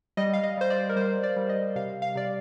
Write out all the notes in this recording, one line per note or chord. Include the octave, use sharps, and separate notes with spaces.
G3 D#5
F5
D#5
G3 C5
D5
A#4
G3 C5
D5
G3
D#5
C3 F5
F5
C3 D5